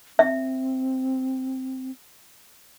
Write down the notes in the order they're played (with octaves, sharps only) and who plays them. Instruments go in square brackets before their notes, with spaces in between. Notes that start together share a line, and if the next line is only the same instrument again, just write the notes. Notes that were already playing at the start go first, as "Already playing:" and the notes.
[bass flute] C4 [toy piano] E5